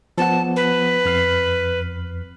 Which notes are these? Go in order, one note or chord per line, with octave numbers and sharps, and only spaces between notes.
F3 B3 F#5 A5
B4
F2 F6 C7